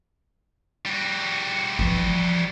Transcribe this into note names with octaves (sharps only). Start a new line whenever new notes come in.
G3 F#4
E3 F3